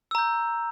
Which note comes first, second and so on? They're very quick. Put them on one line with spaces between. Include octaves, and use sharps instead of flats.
E6 A#5 G6